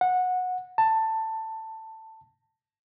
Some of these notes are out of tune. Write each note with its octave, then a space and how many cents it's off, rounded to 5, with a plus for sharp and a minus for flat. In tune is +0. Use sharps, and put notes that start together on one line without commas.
F#5 -15
A5 +15